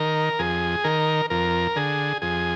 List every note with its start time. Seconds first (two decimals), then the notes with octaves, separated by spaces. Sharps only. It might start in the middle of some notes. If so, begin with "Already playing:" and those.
Already playing: D#3 A#4
0.39 F2 G#4
0.84 D#3 A#4
1.30 F2 A#4
1.76 D3 G#4
2.22 F2 G#4